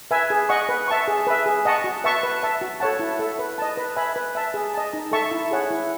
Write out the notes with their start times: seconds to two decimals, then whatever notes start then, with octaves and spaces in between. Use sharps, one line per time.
0.11 B4 E5 G#5
0.30 G#4
0.49 D#5 F#5 C#6
0.69 B4
0.88 E5 A5 C#6
1.08 G#4
1.27 B4 E5
1.46 G#4
1.65 D#5 F#5 A5 C#6
1.84 F#4
2.04 B4 E5 A5 C#6
2.23 B4
2.43 E5 A5
2.61 F#4
2.80 A4 C#5 F#5 A5
2.99 E4
3.19 A4 E5
3.39 B4
3.58 D#5 A5
3.77 B4
3.96 E5 G#5 B5
4.16 B4
4.35 E5 A5
4.54 G#4
4.74 D#5 A5
4.93 D#4
5.12 A4 E5 A5 C#6
5.31 E4
5.51 G#4 C#5 F#5
5.71 E4